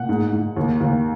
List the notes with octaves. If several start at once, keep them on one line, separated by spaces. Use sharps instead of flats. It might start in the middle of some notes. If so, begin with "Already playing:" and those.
Already playing: A#2 F#5
G#2
G#2
D#2
D#2